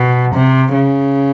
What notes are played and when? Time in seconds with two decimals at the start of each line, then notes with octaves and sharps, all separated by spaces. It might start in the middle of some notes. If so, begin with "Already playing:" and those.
Already playing: B2
0.33 C3
0.73 C#3